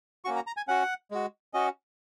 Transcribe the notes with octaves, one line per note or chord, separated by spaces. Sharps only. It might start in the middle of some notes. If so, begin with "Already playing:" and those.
A#3 C#4 F#4 C#6
A#5
A#5
G#5
C#4 F#4 F#5
G#3 F#4
C#4 F#4 D#5